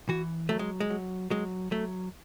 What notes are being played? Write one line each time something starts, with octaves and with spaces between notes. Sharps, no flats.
E3 F#4
F#3 A3
G#3
G#3
F#3
F#3 G#3
F#3 A3